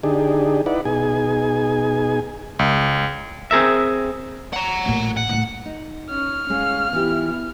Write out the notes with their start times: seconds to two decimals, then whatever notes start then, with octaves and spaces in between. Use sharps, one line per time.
0.03 D3 D4 D#4 G4 G#4
0.66 D#4 E4 B4 D5 F#5
0.85 B2 D#4 G#4 G#5
2.59 C#2
3.51 C4 G#4 A#4 E5
4.53 F#5 A#5
4.86 A1 A#2
5.17 F#5
5.29 A2 A3
5.65 D#4
6.10 C#4 F6
6.50 G#3 C#4 F5
6.93 E3 B3 E4 F4 G4